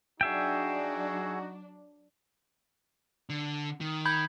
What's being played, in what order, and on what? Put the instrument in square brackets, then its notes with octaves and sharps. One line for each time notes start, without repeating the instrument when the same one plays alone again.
[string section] F#3 D4 [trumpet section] D#4 F#4 [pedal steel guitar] G#4 E5 G5
[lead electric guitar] D3
D#3
[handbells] B5 G6 G#6